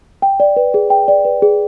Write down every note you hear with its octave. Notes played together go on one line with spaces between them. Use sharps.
G5
D5
B4
G#4
G5
D5
B4
G#4